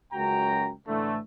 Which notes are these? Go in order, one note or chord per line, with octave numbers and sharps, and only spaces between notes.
C#2 F#2 F#4 G5 A#5
A2 D3 E3 A3